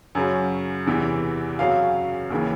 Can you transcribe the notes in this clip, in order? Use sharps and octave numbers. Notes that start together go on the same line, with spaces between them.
F#2 C#3 F#3
E2 C3 E3
F#2 C#3 F#3 F5
D#2 C#3 E3